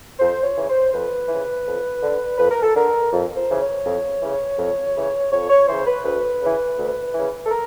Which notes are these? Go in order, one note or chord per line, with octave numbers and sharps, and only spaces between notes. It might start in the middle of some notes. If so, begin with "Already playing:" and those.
F2 C5
C#5
C#3 E3
C5
F2 B4
C#3 E3
F2
D3
F2 B4
A#4
A4
D3 A#4
F2
C5
C#3 E3
C#5
F2
C#3 E3
F2
C#3 E3
F2 C#5
C#5
C#3 E3 C5
B4
D2 B4
C#3 E3
D2
C#3 E3
A4
A#4